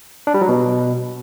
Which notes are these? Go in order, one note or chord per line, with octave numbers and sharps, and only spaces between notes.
D4
G3
F#3
B2